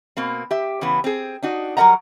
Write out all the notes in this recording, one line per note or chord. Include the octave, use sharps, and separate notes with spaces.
B2 A#3 C4
G4 E5
C#3 E3 B3
C4 G#4
D4 D#4 F#4
F#3 G3 A#4 D#5 F#5 A#5